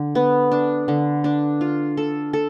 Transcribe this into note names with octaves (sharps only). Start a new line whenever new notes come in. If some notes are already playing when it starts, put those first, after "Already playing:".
Already playing: D3
B3
D4
D3
D4
F4
A4
A4